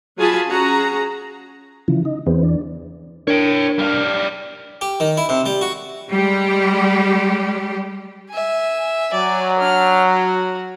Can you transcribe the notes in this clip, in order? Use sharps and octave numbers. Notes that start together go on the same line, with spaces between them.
F#3 F4 G#4 G#5 A5 B5
C#4 F#4 G#4 A#5
C#3 E3 F3
D#4
E2 B3 C4
D4
D4 A#4 C#5 G5
G3 F5
G4
D#3
E4
C3
G3
F#4
G3 G#3 G4
E5 G#5
F#3 D5 G#5
D4 F6
F#4